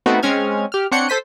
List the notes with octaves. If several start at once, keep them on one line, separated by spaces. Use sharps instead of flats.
A3 B3 C4 D#4 F#4
G#3 C4 C#4 F6 G#6
G4 F6
C4 D4 C#5 F#5 G6 C#7
A4 C5 B6 D#7